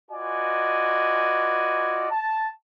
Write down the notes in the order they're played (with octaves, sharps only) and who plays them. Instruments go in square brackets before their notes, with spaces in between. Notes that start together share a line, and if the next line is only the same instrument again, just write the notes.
[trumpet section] F4 F#4 B4 D5 D#5 G#5
A5